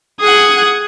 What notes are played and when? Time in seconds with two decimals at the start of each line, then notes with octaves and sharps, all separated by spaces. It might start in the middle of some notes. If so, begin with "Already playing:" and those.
0.20 G#4 F#5 D#6 G#6